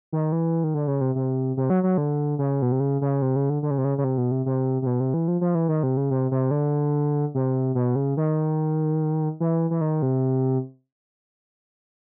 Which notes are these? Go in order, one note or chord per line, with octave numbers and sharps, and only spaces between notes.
D#3
E3
D#3
D3
C#3
C3
C3
C3
F#3
F#3
D3
C#3
B2
C3
C#3
C#3
C3
C#3
D3
D3
C#3
C3
C#3
C#3
C3
B2
C3
C3
C3
B2
C3
E3
F3
F3
E3
D#3
C3
C#3
C3
C3
D3
C3
B2
C#3
D#3
E3
E3
D#3
C3